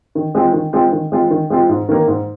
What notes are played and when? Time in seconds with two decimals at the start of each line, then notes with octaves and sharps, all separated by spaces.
0.15 D#3
0.35 G#3 C4 F4
0.53 D#3
0.73 G#3 C4 F4
0.92 D#3
1.12 G#3 C4 F4
1.31 D#3
1.50 G#3 C4 F4
1.69 G#2
1.89 D#3 A#3
2.08 G#2